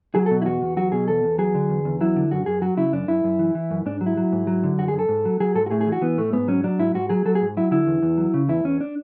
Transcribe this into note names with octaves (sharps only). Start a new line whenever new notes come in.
F#3 G#4
A4
B2
E4
E2 F#4
E2
F#3 F#4
B2 G#4
E2 A4
E2
F#3 G#4
D3
E2
E2
F#3 E4
D3
F#2 F#4
F#2 G#4
F#3 F#4
C#3 E4
F#2 D4
F#2 E4
F#2
E3
E3
F#2
G#2 D4
F#3
E4
F#3
G#2
F#3
D3
F#2 F#4
G#4
F#2
A4
G#2
F#3
F#3 G#4
G#2 A4
F#4
A2 G#4
G#4
E3
F#4
E3 B3
A2 A3
G#2 B3
F#3 C#4
F#3 D4
G#2 E4
G#2 F#4
F#3 G#4
F#3 A4
G#4
G#2
F#3 E4
D3 E4
E2
E2
F#3
C#3
E2 E4
E2 C#4
D4